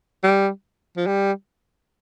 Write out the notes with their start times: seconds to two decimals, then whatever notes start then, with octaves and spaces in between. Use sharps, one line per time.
0.23 G3
0.97 F3
1.07 G3